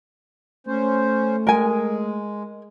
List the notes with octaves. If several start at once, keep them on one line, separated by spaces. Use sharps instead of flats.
A3 C#4 C5
G#3 A#4 G#5